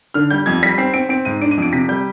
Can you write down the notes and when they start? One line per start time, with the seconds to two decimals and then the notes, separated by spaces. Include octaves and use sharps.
0.14 D3 F6
0.30 G3 G6
0.46 F2 G#6
0.63 G3 B6
0.78 C4 C7
0.94 C4 D7
1.09 C4 D7
1.25 G#2 D#7
1.42 D4 D7
1.51 D#7
1.58 F2 D7
1.73 C3 B6
1.89 G3 G6